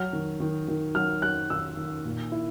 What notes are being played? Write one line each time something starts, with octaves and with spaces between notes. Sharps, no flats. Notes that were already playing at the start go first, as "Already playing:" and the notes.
Already playing: F#3 F6
D#3
D#3
D#3
F#3 F6
F#3 F#6
D#3 E6
D#3
A#2
E4